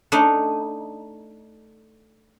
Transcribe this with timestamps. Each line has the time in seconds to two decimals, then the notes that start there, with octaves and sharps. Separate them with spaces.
0.12 A3 D4 D#4